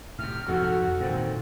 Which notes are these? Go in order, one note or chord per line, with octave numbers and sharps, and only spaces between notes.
A2 C3 F6
F2 G#2 C3 F#4 A4
A#2 D#3 C4